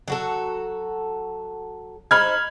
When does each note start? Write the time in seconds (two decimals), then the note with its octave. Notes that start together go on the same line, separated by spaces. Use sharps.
0.08 F#3 F#4 A4
2.11 D#4 C5 B5 F6 G#6